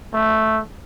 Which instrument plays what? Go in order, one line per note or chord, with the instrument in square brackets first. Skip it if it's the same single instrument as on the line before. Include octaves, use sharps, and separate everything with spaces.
[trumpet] A3